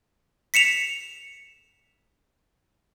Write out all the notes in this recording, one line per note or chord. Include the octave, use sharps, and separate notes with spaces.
B6 C#7 E7 F7